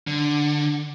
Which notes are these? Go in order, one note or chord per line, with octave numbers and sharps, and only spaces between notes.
D3